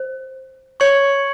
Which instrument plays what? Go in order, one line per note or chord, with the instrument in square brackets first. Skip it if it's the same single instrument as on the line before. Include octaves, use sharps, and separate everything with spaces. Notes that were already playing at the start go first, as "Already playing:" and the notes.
Already playing: [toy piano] C5
[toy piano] C#5 [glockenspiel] C#6 G#6 C#7 F#7